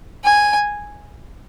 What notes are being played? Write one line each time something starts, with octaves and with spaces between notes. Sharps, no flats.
G#5